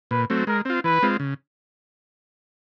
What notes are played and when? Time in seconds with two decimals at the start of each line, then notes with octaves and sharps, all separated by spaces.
0.11 A#2 B4
0.30 F#3 A3 C4
0.47 G#3 A#4
0.65 C4 F4
0.84 E3 B4
1.03 G#3 C4 F4
1.20 C#3